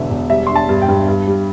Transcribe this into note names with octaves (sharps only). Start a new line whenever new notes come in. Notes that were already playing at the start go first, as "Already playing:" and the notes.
Already playing: E1 E2 D3 E5
E1
G3 E5
D4 C6
A5
G2
G5
G2
G2
G3